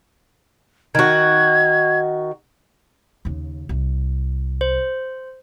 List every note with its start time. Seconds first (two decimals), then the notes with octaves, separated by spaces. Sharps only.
0.95 D#3 F#4 G#6
3.25 D#2 C#3
3.69 C2
4.61 C5